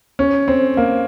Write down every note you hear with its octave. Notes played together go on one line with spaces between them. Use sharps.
C#4
C4
A#3